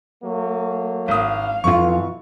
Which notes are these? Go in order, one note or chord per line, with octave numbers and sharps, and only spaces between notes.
F#3 A3 A#3
G#1 F5 D#6
F2 B2 E3 F4 C#6